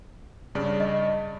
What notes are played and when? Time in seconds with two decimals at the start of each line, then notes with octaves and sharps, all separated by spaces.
0.55 G2 C#3 D5
0.80 D#5